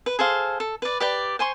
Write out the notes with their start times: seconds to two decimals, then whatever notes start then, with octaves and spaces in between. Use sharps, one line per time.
0.06 B4
0.19 G#4 A4 C5 F5
0.60 A4
0.82 B4 D5
1.00 G4 B4 D5 G5
1.39 C5 G#5 C6 C#6